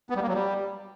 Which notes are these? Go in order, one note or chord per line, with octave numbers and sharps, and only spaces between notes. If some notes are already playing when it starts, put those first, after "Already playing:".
B3
G3
A#3
F#3
G3